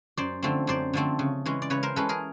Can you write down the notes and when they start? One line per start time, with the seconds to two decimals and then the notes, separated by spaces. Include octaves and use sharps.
0.17 F#2 C5 D5
0.43 D3 F3 A3 C4
0.67 F#2 C5 D5
0.93 D3 F3 A3 C4
1.19 C#3
1.46 E3 G#3 C#4
1.62 D5
1.70 C#3 B4 C#5
1.83 A#4 C5
1.96 E3 G#3 C#4 A4 B4
2.09 G#4 A#4